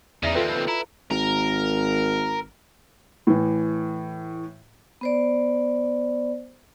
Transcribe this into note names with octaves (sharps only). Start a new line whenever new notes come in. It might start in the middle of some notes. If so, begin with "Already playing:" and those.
E2 C#3 D#4 D5 E5 A#6
D#2 C4 F4 A4 B4
E4 A#5
G#1 A#4
A2 E3
B3 C5 D5